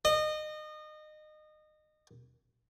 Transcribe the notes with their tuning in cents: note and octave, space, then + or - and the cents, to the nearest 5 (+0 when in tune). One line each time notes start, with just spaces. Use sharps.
D#5 -25